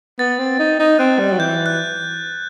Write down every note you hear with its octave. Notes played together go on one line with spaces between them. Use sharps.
B3 A6
C4
D#4
D#4
C4 F#6
G3
F#3
E3 G6
F#6